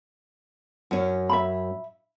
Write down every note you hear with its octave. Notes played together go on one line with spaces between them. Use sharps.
F#2 C#4
E5 B5